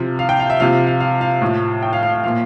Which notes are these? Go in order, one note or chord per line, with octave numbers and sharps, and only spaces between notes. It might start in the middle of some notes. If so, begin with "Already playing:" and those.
Already playing: C3 F3
F5
G5
F5
E5
C3 F3 F5
F5
F5
F5
A2 F3
G5
F5
F5
F5
A#2 F3 F5